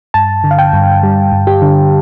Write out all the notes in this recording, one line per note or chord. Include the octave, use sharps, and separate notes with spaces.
G2 A5
D3
F5
G5
G2
G3
G2
G4
D3